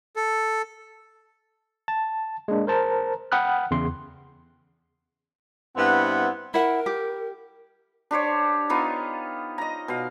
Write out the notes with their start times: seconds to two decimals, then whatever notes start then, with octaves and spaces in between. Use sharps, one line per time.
0.16 A4
1.88 A5
2.48 G#3 A#3 D4
2.67 A#4 C5 A5 A#5
3.32 F#5 G5 B5 D#6 F6 F#6
3.71 E2 C#3 C6
5.76 G2 B3 C4 E4 F#5
6.54 E4 A#4 F#5
6.86 G4
8.11 D4 G4 C5 C#5
8.70 B3 D#4 F4
9.58 D#5 A#5
9.88 B2 F5